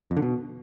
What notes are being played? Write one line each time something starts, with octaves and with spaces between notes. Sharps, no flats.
F2
D3
B2